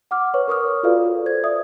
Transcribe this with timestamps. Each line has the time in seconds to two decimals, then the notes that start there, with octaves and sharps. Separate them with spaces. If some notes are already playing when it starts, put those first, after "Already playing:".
0.11 F#5 D6 F6
0.34 B4 C#5 C#6
0.48 A#4 C#6 D#6 F6
0.83 F4 F#4 A4 B4 D5 F5
1.26 C5 G#6
1.44 D5 E5 D#6